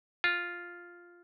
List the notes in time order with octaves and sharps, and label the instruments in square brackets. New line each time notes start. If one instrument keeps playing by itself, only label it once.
[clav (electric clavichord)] F4